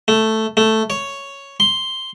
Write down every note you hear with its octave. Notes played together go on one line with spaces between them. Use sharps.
A3
A3
C#5
C6